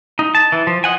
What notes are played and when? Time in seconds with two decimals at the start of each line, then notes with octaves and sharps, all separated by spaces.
0.19 D#4
0.35 A5
0.52 E3
0.67 F3
0.84 D#5 F#5 G#5